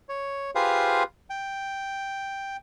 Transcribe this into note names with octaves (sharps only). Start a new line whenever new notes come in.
C#5
F4 G4 G#4 B4 C5 F5
G5